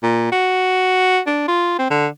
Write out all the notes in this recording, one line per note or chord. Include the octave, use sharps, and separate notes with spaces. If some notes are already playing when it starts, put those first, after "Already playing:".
A#2
F#4
D4
F4
C4
D3